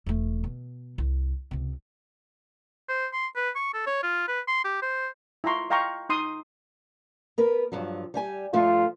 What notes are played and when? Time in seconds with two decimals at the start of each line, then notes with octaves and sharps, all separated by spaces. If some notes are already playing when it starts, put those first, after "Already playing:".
0.06 E1 A3
0.44 B2
0.98 C2
1.51 C#2 C3
2.88 C5
3.13 C6
3.36 B4
3.55 C#6
3.74 A4
3.87 C#5
4.03 F4
4.28 B4
4.47 C6
4.64 G4
4.82 C5
5.44 E4 F4 A#5 C6 C#6
5.70 D#5 F5 G5 A#5 C6 C#6
6.09 D#4 C6 D#6
7.38 B3 A#4 B4
7.72 G2 F3 F#3
8.14 G3 G4 G#5
8.53 G2 F3 A3 F4